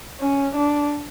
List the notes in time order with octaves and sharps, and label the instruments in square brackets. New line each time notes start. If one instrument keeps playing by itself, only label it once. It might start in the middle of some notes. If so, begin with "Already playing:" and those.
[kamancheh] C#4
D4